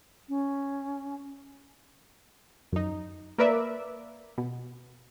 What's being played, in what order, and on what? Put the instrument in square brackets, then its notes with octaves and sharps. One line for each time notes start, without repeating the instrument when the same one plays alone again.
[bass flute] C#4
[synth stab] F#2 D#4
A#3 A#4 B4 D5 E5
B2